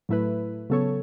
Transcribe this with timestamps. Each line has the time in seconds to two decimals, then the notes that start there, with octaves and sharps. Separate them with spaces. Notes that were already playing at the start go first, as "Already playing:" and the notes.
0.09 A2 F#3 A3 E4 B4
0.70 C#3 F#3 B3 A4 C#5